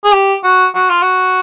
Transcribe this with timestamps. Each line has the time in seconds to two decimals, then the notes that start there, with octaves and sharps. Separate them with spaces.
0.04 G#4
0.13 G4
0.44 F#4
0.75 F#4
0.89 F4
1.02 F#4